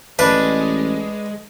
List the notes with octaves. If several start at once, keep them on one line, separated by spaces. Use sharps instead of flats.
A1 G#3 D4 B4